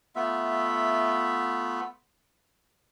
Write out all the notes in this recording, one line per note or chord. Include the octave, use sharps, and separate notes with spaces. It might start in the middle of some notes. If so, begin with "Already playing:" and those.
A3 B3 F4 E5